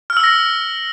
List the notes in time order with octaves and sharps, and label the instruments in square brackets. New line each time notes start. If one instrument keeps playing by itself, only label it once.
[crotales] F6
E6
A#6